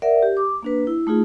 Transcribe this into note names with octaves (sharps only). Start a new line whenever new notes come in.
A#4 D5 E5 F#5
G4
D6
A#3 D4 B4
E4
A3 D#4 F4 G#4